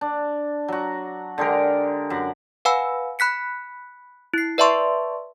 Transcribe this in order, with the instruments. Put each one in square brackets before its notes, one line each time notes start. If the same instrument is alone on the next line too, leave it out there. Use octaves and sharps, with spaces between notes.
[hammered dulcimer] D4
F#3 F#4
D3 G#3 G4 A#4
F#2 F#5
[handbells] B4 F5 F#5 G#5 B5 E6
B5 F#6 B6 C#7
E4 C7
B4 D5 E5 A5 C6 C#6